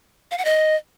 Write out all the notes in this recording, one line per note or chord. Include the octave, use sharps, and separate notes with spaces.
F5
F#5
D#5